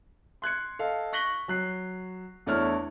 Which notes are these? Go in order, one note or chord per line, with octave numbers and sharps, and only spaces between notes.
C6 F#6 G#6 C#7
A4 D#5 F5
C#6 F#6 A#6 B6 F#7 G7
F#3 F#6 C7
E2 A3 D4 E4 C#5 F6